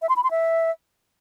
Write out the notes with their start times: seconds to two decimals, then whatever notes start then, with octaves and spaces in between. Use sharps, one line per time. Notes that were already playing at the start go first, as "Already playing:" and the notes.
0.02 E5
0.09 C6
0.16 B5
0.24 C6
0.31 E5